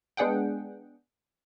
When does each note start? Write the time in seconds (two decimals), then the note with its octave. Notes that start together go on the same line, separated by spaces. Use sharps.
0.17 G#3 B3 D4 G#4 F#5 G5